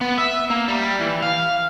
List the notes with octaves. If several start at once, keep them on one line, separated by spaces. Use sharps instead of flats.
B3
E5
A#3
G3
E3
F5